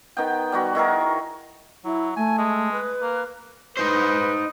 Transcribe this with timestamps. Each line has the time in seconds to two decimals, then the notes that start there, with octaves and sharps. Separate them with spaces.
0.17 D#3 B3 G5
0.52 G3 B3 F#4
0.75 D#3 E4 G#4 A#4
1.85 F#3 E4
2.16 A3 G#5
2.38 G#3
2.72 B4
3.02 A#3
3.77 D#4 B4 C5